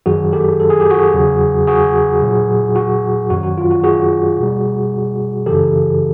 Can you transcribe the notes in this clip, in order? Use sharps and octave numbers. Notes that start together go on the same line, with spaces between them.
F#2 D#3 F#3 F#4 G#4
G4 A4
A4
G#4
G4
F#4 G#4
E2 C#3 F#3
F#4 G#4
A#2 F#3
F#4
F#2 D#3 F#3 F#4
F#4
F4
F#4
F#4 G#4
B2 G3
F#2 C#3 E3 G4 A4